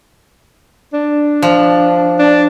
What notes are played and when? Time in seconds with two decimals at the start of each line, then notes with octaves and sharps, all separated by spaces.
0.94 D4
1.42 F3
2.19 D4